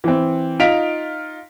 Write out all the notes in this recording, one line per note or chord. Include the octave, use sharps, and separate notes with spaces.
E3 C4
D#4 F4 B6 D7 F7